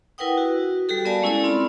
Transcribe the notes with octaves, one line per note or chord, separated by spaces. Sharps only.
E4 A#4 B4 F#5 G5 D#6
F#4
G3 F#4 G4 A4
B3 A#4 D5 F5 G#5 A5
G#3 C#4 E4 A4 D5
C4 F4 B5